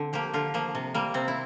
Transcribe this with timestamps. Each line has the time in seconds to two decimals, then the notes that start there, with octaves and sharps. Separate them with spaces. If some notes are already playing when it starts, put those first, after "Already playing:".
Already playing: D3 C4
0.13 F3 A#3 G4
0.34 D3 F4
0.54 F3 A#3
0.75 C3
0.94 G3 A#3
1.14 C3 C4
1.28 E4